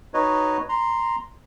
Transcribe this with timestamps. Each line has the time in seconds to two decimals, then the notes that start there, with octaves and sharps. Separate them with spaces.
0.14 D#4 F#4 B4 C#5 D#5
0.69 A#5 C6